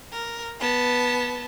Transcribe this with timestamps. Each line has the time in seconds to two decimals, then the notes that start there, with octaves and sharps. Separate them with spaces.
0.12 A#4
0.60 B3 A5